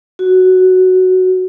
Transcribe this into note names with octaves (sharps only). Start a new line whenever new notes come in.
F#4